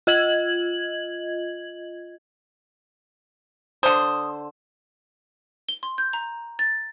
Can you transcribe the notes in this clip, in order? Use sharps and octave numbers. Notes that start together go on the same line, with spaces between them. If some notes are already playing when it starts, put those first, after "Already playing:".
F4 D#5 G#6 F#7
D3 C5 D#6
G7
C6
G6
A#5
A6